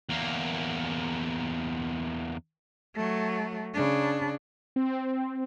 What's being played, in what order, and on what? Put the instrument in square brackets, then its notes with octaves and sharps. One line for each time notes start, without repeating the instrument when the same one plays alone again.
[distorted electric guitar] E2 A#3
[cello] F#3 A3
C#3 D4
[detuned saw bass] C4